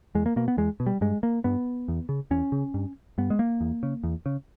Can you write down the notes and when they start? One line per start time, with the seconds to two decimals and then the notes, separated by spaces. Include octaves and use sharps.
0.15 E2 G#3
0.26 A#3
0.36 B2 A#3
0.48 B3
0.57 E2 G#3
0.80 B2
0.86 G3
1.01 G2 G#3
1.23 A#3
1.44 G2 B3
1.88 E2
2.09 C#3
2.31 E2 C#4
2.52 C#3
2.74 G2
3.18 G2 B3
3.30 G#3
3.39 A#3
3.61 E2
3.83 C#3
4.04 E2
4.26 C#3